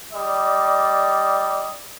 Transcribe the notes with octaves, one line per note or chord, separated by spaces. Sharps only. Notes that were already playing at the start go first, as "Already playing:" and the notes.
G3 D5 D#5